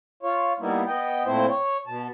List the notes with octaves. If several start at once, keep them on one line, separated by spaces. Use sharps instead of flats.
F4 C#5
G3 A#3 B3 D#4 E4
B3 D#5 G5
A#2 A3 C4 E4 C5
C#5
B2 A5